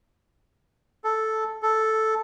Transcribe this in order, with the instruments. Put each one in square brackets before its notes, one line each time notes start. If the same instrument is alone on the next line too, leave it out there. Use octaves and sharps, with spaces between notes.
[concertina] A4
A4